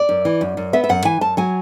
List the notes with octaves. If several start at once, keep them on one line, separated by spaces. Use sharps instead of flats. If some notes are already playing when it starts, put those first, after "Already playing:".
Already playing: D5
F#2
E3
F#2
F#2
B3 E5
E5
F#2 F#5
E3 G#5
F#2 A5
F#3 G#5